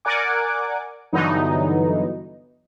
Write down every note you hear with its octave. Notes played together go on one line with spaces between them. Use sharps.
A#4 D5 F#5 G#5 D6
G2 D3 E3 F#3 B3 D#4